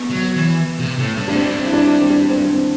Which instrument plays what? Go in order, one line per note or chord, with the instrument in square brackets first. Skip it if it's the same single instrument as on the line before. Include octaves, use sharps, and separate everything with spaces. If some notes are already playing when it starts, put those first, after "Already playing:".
Already playing: [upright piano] B3
[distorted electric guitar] F#3
E3
C3
A2
G2
[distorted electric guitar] A2 [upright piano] D4
[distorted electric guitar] G2 [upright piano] C4
[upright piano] E4
D4
C4
D4
C4